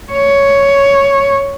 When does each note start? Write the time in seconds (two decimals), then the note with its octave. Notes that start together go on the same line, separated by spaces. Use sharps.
0.12 C#5